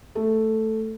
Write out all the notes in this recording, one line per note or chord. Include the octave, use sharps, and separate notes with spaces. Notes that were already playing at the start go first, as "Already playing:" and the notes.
A3